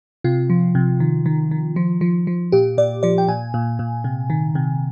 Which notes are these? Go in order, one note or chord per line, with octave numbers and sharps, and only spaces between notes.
C3 F4
F3
C3
D#3
D#3
D#3
F3
F3
F3
A#2 G4
A#2 D5
F3 D5
G5
A#2 G#5
A#2
A#2
C3
D#3
C3